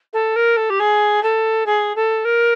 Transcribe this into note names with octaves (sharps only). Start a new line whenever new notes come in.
A4
A#4
A4
G4
G#4
A4
G#4
A4
A#4